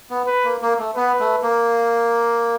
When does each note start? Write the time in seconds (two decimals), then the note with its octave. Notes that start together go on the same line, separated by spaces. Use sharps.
0.10 B3
0.27 B4
0.45 A#3
0.62 A#3
0.79 A3
0.96 B3 B4
1.20 A3
1.43 A#3